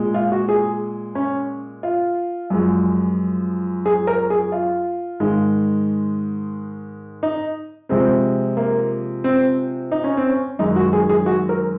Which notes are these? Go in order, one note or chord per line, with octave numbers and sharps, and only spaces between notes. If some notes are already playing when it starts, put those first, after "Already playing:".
Already playing: A#2 G#3
F4
F#4
G#4
C#4
F4
F#2 F3 G#3
G#4
A#4
G#4
F4
G#2 D#3 G#3
D#4
C3 F3 G#3 C4
A#3
C4
D#4
C#4
C4
C#4
F#2 D#3 G#3 D#4
F#4
G#4
G#4
F#4
A#4